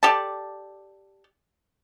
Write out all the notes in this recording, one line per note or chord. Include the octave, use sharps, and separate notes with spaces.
G4 A4 D5 A5